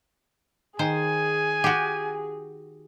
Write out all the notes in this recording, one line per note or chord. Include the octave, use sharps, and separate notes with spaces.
D#3 G#4 C5 G#5
F#4 G4